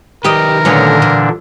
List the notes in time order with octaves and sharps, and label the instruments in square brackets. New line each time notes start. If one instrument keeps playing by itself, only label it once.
[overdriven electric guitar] D#3 B4 [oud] G4 D5 D#5 [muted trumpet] A#4
[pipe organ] A#2 D3 D4 [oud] A3 B3 C#4
[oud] E3